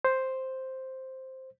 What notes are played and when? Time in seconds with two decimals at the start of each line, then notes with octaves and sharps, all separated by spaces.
0.05 C5